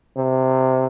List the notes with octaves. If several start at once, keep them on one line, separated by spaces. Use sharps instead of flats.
C3